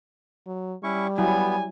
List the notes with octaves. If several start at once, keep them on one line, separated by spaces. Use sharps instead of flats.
F#3
G3 C#4 E4 C#6
F#3 B3 E4 G#5